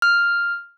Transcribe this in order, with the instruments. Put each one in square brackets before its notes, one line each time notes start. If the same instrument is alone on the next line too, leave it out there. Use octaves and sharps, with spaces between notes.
[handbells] F6